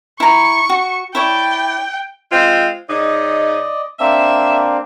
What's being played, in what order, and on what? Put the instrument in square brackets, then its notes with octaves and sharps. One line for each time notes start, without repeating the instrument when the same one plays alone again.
[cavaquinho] E4 A#5 [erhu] C#6
[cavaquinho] F#4
[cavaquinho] E4 C#5 D5 [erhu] G5
[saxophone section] G#3 C4 F4
[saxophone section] C#3 D#4 [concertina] D5 D#5
[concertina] A#3 C4 D4 [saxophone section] E5